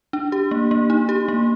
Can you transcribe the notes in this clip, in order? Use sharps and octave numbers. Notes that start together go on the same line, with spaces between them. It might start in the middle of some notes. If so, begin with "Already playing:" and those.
D4
G4
A#3
A#3
D#4
G4
A#3